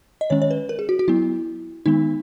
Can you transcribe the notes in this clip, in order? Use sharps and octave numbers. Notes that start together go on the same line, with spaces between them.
D#5
D#3 G#3 C#4 C#5
C#5
B4
A#4
G#4
F#4
F#4
F#3 B3 E4
D#3 G#3 B3 D#4